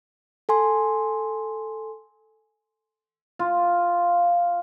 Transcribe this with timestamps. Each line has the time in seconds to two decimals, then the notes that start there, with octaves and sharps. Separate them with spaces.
0.49 A4 G#5 C6
3.39 F4